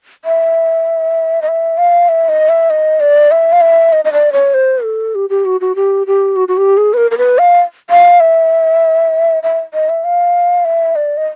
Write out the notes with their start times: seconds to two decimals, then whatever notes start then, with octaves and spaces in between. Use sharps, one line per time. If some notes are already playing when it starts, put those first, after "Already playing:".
0.25 E5
1.42 D#5
1.48 E5
1.78 F5
2.09 E5
2.29 D#5
2.49 E5
2.70 D#5
3.00 D5
3.31 E5
3.53 F5
3.61 E5
3.93 D#5
4.05 D#5
4.13 D5
4.33 C#5
4.54 C5
4.84 A4
5.15 G4
5.30 G4
5.45 F#4
5.61 F#4
5.76 G4
6.07 G4
6.36 F#4
6.48 F#4
6.57 G4
6.77 G#4
6.93 B4
6.97 A#4
7.11 A#4
7.18 B4
7.38 F5
7.90 F5
8.20 E5
9.43 E5
9.74 D#5
9.89 E5
10.04 F5
10.65 E5
10.96 D5
11.17 D#5